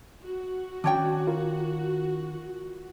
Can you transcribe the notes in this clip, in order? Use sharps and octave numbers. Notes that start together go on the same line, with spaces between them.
F#4
D#3 C#4 D4 C#5 G5 G#5 D6
F4 A#4